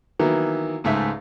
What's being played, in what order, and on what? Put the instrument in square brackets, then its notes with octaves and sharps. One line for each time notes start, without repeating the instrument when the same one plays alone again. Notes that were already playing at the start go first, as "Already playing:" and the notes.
[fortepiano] D#3 E3 F#3 A#3 B3 E4
C#2 G#2 A3 E5